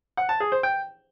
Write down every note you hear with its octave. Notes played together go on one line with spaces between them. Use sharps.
F#5
A5
G#4
C5
G5